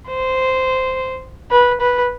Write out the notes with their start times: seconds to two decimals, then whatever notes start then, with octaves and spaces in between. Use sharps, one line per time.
0.09 C5
1.51 B4
1.81 B4